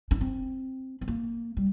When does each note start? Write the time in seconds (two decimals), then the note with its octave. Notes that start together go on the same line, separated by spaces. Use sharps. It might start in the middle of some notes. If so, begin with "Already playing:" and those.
0.11 D4
0.21 C4
1.01 C4
1.08 A#3
1.57 G3